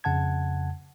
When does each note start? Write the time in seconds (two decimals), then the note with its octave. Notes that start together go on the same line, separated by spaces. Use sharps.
0.04 F2 C#3 F#5 A5 G#6